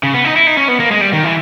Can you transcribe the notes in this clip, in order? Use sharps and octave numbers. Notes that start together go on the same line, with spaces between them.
C#3
B3
D#4
E4
D#4
C#4
B3
A#3
G#3
G3
D#3
E3